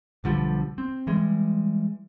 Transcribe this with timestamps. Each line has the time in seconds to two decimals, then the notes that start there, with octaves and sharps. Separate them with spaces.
0.24 B1 D3 F3 G3
0.78 C4
1.07 E3 G3 G#3